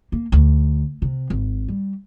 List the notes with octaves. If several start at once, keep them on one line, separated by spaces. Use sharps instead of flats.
A#3
D2
C3
G#1
G3